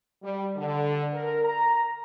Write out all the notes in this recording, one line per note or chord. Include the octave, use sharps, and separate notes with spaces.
G3
D3
A#4
A#5